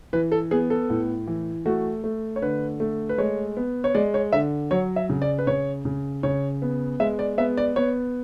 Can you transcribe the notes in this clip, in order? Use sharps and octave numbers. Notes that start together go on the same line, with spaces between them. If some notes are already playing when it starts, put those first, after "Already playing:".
E3 B4
A4
B3 G#4
A4
A2
E3
A3 F#4
A3
C#5
D3 B4
A3
B4
G#3 C#5
B3
C#5
G#3 D5
C#5
D3 E5
F#3 C#5
E5
C#3
D5
B4
C#3 C#5
C#3
C#3 C#5
B3
G#3 E5
D5
B3 E5
D5
B3 C#5